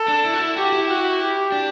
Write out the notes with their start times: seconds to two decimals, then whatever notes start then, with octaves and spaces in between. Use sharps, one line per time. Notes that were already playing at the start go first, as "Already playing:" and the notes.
Already playing: A4
0.08 D4
0.25 E4
0.34 F#4
0.40 E4
0.56 F#4 G4
0.72 E4
0.89 F#4
1.20 G4
1.52 D4